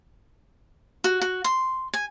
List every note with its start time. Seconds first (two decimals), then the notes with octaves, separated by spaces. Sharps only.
1.04 F#4
1.21 F#4
1.44 C6
1.94 G#5